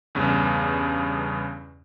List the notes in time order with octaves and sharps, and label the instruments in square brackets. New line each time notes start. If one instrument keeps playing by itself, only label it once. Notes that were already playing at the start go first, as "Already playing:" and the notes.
[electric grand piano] E2 G2 C#3